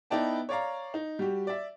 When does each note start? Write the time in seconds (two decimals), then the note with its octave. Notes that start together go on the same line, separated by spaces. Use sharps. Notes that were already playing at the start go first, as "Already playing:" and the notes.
0.10 B3 D#4 E4 D5 G5 A5
0.49 C#5 D5 F5 A#5
0.94 D#4
1.19 G3 F#4 G4
1.47 D5 E5